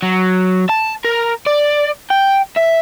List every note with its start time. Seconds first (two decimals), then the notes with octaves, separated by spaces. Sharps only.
0.03 F#3
0.69 A5
1.04 A#4
1.46 D5
2.10 G5
2.56 E5